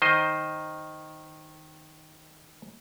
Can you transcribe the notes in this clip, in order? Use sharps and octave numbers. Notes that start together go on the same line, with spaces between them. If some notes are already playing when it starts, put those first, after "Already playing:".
D#3 C5 D#5